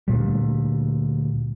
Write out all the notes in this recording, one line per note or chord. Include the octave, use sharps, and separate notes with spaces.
D2 A#2 G3